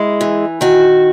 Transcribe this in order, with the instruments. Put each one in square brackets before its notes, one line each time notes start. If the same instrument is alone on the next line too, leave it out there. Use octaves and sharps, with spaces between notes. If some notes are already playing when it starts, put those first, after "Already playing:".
Already playing: [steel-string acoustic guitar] G#3 E4
E3
D#3 F#4